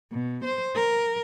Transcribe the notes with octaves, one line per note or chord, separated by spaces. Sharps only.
B2
C5
A#4